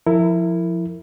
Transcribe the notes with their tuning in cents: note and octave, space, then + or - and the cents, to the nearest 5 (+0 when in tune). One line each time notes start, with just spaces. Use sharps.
F3 +0 E4 +0 A#4 -30